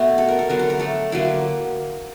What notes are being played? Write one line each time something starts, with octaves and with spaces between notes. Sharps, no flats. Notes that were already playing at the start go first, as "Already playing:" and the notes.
Already playing: B2 A3 B3
A4
A#4
A4
D3 F#3 B3 A#4
A4
A#4
A3 A4
D3 F#3 A#3 E4